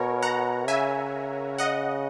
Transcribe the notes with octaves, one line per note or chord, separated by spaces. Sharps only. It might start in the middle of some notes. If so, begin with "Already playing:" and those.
Already playing: B2 A#4 C#5
F#5 A#5
C#3 E5 G#5
D#5 F#5